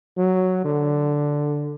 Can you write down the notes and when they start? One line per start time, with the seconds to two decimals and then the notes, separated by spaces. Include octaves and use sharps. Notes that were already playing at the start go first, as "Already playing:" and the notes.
0.17 F#3
0.65 D3